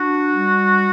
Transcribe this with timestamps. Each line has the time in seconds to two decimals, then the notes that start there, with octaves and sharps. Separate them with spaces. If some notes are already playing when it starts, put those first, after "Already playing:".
Already playing: D4 F#4
0.30 G3